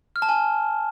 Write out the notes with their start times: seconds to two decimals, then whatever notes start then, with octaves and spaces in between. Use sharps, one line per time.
0.16 F6
0.22 A5
0.29 G#5